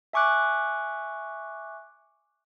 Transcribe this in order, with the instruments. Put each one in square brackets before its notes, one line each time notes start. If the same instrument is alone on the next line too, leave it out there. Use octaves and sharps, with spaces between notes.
[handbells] E5 G#5 C#6 D6 F#6